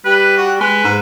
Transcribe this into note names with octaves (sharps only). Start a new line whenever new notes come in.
G3 B4
F#4
G#3 B4
G#2